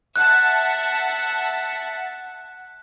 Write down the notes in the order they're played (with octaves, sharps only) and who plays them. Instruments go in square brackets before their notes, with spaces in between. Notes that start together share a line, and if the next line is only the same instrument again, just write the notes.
[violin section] E5 F#5 A5 [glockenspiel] F#6